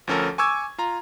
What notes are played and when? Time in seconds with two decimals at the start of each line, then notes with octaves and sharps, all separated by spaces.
0.07 D2 F3 C#4 A4 A#4
0.38 G#5 C#6 D6 E6 G#6
0.78 F4 A#5